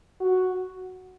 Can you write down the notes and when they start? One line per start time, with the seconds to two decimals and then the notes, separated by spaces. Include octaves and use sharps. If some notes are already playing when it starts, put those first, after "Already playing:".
0.20 F#4